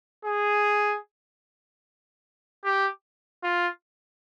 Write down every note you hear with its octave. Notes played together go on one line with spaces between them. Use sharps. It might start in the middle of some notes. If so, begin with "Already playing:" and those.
G#4
G4
F4